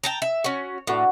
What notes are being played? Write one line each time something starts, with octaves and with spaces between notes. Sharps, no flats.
G5 A5 A#5
E5
C#4 F#4 C#5
A2 D4 F#4 B4